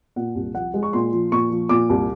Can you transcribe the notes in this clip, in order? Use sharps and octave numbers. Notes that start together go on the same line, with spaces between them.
A#2 F#5
C2
F3 F#5
G#3
C#6
A#2 C6
F3
A#2 C#6
F3
A#2 D6
C2